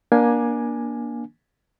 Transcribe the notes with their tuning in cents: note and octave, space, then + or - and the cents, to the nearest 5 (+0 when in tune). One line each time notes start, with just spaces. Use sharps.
A#3 +25 D4 +0 G#5 +0